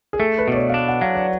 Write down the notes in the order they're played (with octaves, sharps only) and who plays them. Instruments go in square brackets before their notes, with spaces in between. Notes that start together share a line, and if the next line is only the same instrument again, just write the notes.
[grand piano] G#4
[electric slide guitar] A3 [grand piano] A4
[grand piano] B4
[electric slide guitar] B2 [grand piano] D5
[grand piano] C#5
F5
[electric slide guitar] D4 [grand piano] D5
[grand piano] F#5
[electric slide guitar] F#3 [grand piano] F5
[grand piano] D5